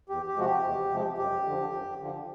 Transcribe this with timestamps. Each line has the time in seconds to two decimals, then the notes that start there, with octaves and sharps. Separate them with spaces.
0.09 E2 G4
0.27 G4
0.36 C3 F3 G#3 F#4
0.45 G4
0.64 E2
0.91 C3 F3 G#3
1.18 F#2 G4
1.45 D3 F3
1.73 F#2
2.00 D3 F3